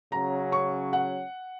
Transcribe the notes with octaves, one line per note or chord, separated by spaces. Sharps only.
C#3 F#3 C#4 A#5
C#6
F#5